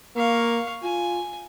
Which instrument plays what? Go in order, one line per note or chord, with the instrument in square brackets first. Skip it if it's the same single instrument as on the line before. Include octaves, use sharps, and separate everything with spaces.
[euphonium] A#3 [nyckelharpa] F5 C#6
[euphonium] F4 [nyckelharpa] G#5